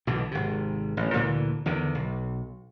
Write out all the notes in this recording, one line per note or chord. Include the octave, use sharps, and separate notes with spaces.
B1 B2 D3 E3
G#1 C3
A1
D2 A#2 D3 E3
E2 D3 D#3
B1